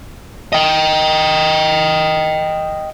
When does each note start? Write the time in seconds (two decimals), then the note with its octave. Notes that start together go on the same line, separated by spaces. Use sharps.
0.53 D#5 G5